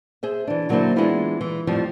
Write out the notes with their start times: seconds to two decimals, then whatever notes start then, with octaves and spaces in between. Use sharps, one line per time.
0.23 G#4 C5 E5
0.47 E3 D4
0.69 D3 F#3 A#3 D4 E4 C5
0.96 E3 G#3 B3 D4 E4 F4
1.41 E3
1.67 F2 A2 F3 G3